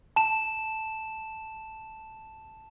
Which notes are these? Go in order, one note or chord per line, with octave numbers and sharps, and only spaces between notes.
A5 E7